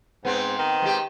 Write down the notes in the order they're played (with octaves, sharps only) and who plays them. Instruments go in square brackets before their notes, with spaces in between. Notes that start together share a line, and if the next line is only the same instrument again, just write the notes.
[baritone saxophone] G#2 [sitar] B3 C4
[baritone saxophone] D#3
[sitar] G#3 G4